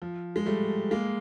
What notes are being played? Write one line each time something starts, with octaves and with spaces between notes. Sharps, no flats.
F3
G#3
G3 A3
G#3 A#3